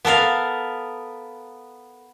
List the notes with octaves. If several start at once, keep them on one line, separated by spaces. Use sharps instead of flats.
B3 A4 A#4 F5